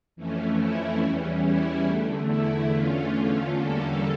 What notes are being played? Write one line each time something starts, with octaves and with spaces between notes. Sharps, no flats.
F2 E3 A3 C#4
E4
E2 E3 G3 C#4
E4
E2 D3 A3
E4
E2 D3 A3 C#4 F4
E2 D3 G3 A#3 C#4 A4